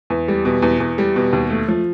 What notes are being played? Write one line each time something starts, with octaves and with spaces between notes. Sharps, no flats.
E2
G3
B2
E2
E2
G3
B2
D#2
A3
F3